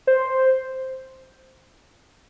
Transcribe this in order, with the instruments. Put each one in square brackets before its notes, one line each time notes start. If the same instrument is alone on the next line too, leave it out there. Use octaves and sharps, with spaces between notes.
[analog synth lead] C5